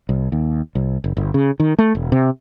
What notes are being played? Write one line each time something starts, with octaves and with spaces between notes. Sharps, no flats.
C2
D#2
C2
F#1
G1
C#3
D#3
A3
E1
C3